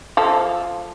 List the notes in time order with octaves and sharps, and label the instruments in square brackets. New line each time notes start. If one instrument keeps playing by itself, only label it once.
[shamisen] F3 A4